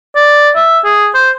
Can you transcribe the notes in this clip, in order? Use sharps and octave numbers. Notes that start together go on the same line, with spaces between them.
D5
E5
G#4
C5